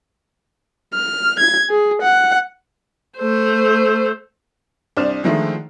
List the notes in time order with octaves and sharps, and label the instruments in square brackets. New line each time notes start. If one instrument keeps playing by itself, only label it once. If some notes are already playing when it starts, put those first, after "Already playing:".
[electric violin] F6
G#6
G#4
F#5
[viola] A3 C5
[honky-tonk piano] C2 D4 C5 D5 F6 E7
D3 D#3 F3 G#3 A3